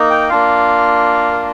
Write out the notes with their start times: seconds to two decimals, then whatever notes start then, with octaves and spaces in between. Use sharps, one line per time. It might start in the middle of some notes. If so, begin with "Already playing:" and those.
Already playing: A#3 D#4
0.10 G5
0.29 A#3 D4 F4 F5
1.32 A#4